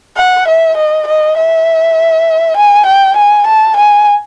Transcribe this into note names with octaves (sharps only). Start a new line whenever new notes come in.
F#5
E5
D#5
D#5
E5
G#5
G5
G#5
A5
G#5